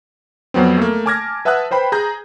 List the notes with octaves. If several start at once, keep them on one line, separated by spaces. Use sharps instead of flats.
F2 F#3 B3 C4
A3 A#3
G#5 A5 D6 F6 G#6 A#6
B4 E5 F#5 A5 D#6 F#6
B4 C5 G5 B5
G#4 A#5 G6